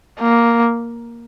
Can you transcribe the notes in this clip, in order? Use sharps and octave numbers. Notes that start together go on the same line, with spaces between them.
A#3